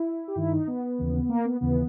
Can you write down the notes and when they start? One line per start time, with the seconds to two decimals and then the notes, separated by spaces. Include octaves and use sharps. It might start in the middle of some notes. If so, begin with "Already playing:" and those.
Already playing: E4
0.28 G4
0.36 G2 D#3 E4
0.52 D#4
0.67 B3
0.98 D#2 C#3 E3
1.29 A#3
1.45 B3
1.61 D#2 C#3 E3 B3